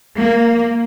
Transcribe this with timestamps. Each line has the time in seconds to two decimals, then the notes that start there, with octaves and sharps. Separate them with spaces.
0.16 A#3